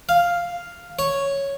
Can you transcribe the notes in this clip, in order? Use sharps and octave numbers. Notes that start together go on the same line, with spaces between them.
F5
C#5